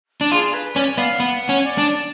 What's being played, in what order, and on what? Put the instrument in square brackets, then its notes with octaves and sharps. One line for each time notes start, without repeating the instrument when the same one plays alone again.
[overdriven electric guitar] D4
[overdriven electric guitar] F4 [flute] G#4
[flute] B4
[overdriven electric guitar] C#4 [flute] D5
[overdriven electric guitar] B3 [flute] F5
[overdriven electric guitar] B3 [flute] F#5
[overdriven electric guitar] C#4
[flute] D5
[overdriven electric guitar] D4